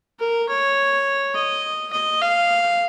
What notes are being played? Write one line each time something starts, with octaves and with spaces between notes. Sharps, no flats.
A#4
C#5
D#5
D#5
F5